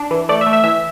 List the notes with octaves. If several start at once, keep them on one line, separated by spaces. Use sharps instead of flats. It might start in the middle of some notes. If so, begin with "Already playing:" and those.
Already playing: D4
E3
A3 D5
E5
A3
E5
E3 E5